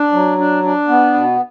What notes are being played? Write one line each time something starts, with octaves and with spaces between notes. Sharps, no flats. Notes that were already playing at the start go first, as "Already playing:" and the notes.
Already playing: D4
F#3
D4
D4
B3
B2